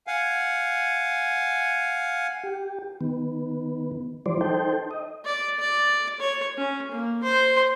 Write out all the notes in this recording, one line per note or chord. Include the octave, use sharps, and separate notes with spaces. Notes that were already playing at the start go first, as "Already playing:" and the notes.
F5 F#5 G#5
G4
D#3 B3
E3 F3 G3 C5 D5
D#4 A4 C5 G5
D#5
D5
D5
C#5
C#4
A#3
C5